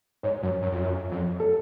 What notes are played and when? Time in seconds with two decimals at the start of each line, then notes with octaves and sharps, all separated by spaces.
0.23 G#2 C#5
0.43 F#2
0.62 F#2
0.72 F2
0.81 F#2
1.11 F2
1.40 A4